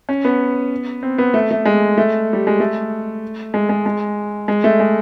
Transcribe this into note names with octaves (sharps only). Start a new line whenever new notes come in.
C#4
B3
C4
B3
A3
A3
G#3
A3
G3
G#3
A3
G#3
G#3
G#3
G#3
A3
G#3